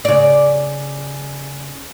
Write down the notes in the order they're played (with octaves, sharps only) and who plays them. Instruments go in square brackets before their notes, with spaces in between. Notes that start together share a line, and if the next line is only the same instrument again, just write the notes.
[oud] C#3 D5